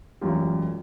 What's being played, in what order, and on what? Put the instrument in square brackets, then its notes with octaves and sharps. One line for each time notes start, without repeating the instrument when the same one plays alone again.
[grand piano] E1 A1 F#2 C#4 F4 G4